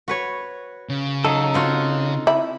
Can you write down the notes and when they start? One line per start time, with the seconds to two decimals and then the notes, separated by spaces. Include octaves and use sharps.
0.08 F#4 B4 C#5
0.89 C#3
1.25 F#3 D#4 A4
1.54 C4 F4 F#4
2.27 E4